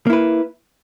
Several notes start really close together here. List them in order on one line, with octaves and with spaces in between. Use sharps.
A#3 E4 B4